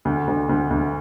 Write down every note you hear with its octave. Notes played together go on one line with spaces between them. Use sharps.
D2
D2
D2
D2